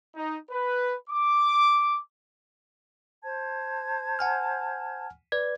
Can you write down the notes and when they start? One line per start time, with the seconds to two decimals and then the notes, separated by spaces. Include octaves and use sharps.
0.16 D#4
0.51 B4
1.10 D6
3.23 C5 A5 G#6
4.19 F#5 G#5 F6
5.32 B4 D5 G#6